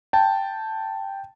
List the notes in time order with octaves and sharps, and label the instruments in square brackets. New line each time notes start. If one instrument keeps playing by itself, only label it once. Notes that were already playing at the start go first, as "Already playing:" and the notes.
[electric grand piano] G5 A5